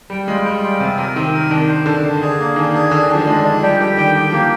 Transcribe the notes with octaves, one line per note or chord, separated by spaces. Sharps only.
G3 G5
G#3 F4
G3 G5
F4
C3 C4
C3 A#4
D#3 C4
A#4
D#3 D4
C5
D3 D4
D4
G#4
A#3
D#3 D4
G#4
D3 D4
D#3
F3 D4
G#3 D4
D4
G3 G4
D3 G4
D#3 G5
D#3 G4
F3 A#3